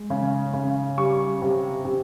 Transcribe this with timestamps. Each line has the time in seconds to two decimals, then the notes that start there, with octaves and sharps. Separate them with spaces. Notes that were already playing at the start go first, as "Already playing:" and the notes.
Already playing: G#3
0.10 C#3
0.54 C#3
0.98 G3 C#6
1.42 C3
1.85 C3